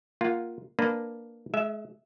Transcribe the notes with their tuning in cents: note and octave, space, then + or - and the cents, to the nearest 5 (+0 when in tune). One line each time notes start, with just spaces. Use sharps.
A#3 +0 F4 +0 F#5 +0
A#3 +0 D4 +0 B4 +0
G#3 +35 E5 +0